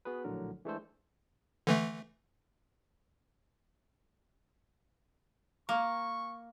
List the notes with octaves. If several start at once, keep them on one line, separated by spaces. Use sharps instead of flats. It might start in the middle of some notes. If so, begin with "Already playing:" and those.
B3 F#4 G#4 B4
A#1 A2 D3 F#3 A#4
E3 G#3 A3 D4 A4 C5
D3 E3 A3
A#3 C#6